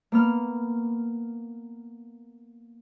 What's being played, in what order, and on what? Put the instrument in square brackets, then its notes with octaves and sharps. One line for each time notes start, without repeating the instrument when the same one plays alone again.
[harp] A#3 B3 F6